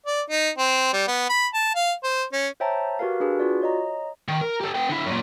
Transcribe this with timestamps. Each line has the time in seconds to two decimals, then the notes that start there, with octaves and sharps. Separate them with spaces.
0.06 D5
0.30 D#4
0.58 C4
0.93 G3
1.08 B3
1.29 B5
1.54 A5
1.75 F5
2.04 C5
2.32 C#4
2.60 C5 C#5 E5 G5 A5 A#5
2.99 F#4 G4 A#4 B4 F5
3.20 D4 F#4 G#4 B4
3.39 F4 F#4 D5
3.62 C#5 D#5 A#5
4.28 D#3
4.41 A#4
4.61 G4 A4
4.75 B3 G5
4.89 D3 E4
5.06 F#2 A#2